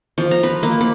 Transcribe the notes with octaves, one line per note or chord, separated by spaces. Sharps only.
F3
A#5
B4
A#3
B5